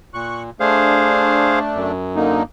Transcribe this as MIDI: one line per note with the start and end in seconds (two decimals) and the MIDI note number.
0.14 0.50 46
0.14 0.43 85
0.14 0.43 90
0.60 1.92 57
0.60 1.92 62
0.60 1.59 68
0.60 1.59 72
0.60 1.59 77
1.75 2.43 42
2.16 2.43 50
2.16 2.43 58
2.16 2.43 63